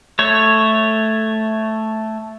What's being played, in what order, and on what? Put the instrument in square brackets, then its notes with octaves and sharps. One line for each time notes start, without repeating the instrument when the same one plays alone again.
[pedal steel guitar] A3 C#5